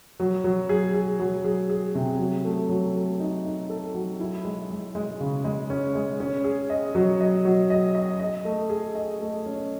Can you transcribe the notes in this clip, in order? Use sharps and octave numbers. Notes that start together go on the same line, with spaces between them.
F#3
F#3
G#4
G#4
F#3
G#4
G#4
C3
F#3
A3
F#3
A3
D#4
D#4
A4
F#3
E4
G#3
G#3
G#3
C#3
G#3
C#4
G#3
C#4
G#4
D#5
F#3
D#5
F#3
D#5
D#5
D#5
A3
G#4
D#5
A3
C#4